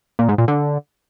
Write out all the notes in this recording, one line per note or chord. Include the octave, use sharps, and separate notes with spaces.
A#2
G#2
A#2
D3